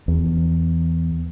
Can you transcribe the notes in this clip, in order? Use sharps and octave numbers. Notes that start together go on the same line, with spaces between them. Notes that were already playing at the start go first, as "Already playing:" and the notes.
E2